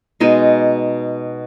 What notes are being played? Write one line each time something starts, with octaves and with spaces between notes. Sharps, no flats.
B2 G#3 D#4 G#4